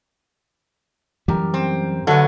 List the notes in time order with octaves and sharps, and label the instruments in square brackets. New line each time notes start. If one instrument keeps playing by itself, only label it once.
[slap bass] F#2 E3 G3 [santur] G4 A#4
[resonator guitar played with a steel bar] C4
[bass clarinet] D3 [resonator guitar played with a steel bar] F#3 B3 [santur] A3